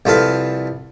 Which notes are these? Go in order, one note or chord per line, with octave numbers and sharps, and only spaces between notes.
C2 F3 A4 B4 F5